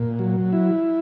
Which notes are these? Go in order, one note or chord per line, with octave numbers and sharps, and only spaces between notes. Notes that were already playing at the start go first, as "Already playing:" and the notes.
Already playing: A#2
F#3
E4